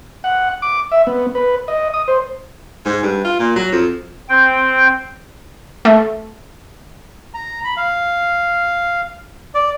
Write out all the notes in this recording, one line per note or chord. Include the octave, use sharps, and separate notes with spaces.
F#5
D6
E5
B3
B4
D#5
D#6
C5
G#2
G2
F4
A#2
F#3
F2
C4 G5
A3
A#5
B5
F5
D5